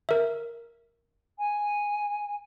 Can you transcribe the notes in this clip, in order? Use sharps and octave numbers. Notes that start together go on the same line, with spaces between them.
A#4 E5
G#5